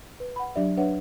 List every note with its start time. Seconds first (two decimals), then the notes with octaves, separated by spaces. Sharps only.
0.20 B4
0.36 F#5 B5
0.55 F#3 D4 G4 D5 E5
0.77 D4 B4 C#5 E5 F#5